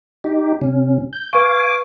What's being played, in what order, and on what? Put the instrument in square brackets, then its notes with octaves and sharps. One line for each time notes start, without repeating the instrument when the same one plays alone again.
[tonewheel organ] D#4 G4
C3 C#4
G6
[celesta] B4 C#6 [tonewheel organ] F5 G#5 D6